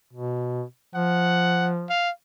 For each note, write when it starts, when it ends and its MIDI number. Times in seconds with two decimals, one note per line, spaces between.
0.13 0.64 47
0.95 1.86 53
0.95 1.70 78
1.89 2.10 77